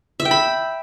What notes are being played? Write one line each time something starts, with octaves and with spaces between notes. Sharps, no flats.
E5
G5
B5